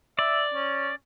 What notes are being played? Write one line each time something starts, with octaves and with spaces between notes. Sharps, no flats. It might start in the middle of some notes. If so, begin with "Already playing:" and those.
D5 E5
C#4